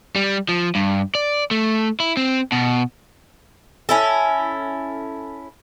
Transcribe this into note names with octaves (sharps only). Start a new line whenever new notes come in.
G3
F3
G2
D5
A3
E4
C4
B2
C#4 E4 A4